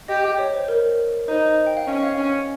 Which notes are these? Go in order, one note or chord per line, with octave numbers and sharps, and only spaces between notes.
G4 D#5
C#5
C5
A#4
D#4 C5
G5
F5
C#4 D#5
F5
C#4